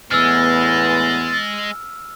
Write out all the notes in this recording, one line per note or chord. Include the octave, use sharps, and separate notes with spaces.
E2 A2 G#3 B3 E6 F6 A6